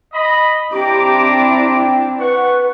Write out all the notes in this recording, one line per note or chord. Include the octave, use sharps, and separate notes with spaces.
D#5 B5
C4 D4 E4 G4 A#5 D6
G5
B4 F#5 C#6